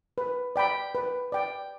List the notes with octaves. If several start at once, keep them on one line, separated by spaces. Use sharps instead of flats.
B4
D5 G5 B5
B4
D5 G5